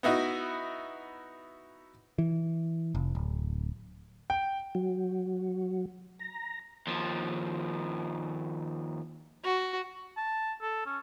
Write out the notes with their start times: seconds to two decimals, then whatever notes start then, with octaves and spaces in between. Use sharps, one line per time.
0.03 B3 D#4 E4 F#4
2.18 E3
2.95 F1
3.15 D1
4.30 G5
4.75 F#3
6.19 A#5
6.87 D#2 F3
9.44 F#4
10.17 A5
10.62 A4
10.86 C#4